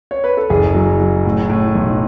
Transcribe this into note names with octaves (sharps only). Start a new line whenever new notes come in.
C#5
B4
A4
F#1 G#4
F#3
F#3
A2
A2
B1